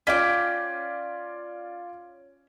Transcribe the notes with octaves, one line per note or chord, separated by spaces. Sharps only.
C#4 F4 D5 G5 D6 B6